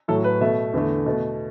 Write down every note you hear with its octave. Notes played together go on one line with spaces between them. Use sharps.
A2 F#3 A3 A4
B4
B2 A3 E5
E2 D3 A3
B2 A3